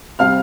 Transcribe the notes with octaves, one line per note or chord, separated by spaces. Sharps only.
C3 G3 C4 F5 F6